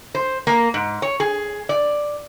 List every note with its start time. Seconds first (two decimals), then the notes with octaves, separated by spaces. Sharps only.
0.15 C5
0.47 A#3
0.74 G#2
1.02 C#5
1.20 G#4
1.69 D5